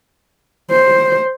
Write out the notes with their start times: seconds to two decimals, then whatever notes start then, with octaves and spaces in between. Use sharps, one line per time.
0.71 C5